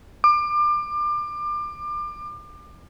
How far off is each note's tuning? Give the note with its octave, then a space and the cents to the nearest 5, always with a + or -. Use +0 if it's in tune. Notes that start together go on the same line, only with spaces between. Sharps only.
D6 +30